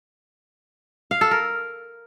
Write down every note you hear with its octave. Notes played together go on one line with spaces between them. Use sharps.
F5
A4
A#4